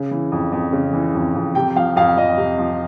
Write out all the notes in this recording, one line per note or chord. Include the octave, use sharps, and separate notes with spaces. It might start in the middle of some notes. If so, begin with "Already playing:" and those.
Already playing: C#3
E3
F2
F2
C#3
E3
F2
F2
C3 G5
F3 F5
F2 F5
F2 D#5
C3
F3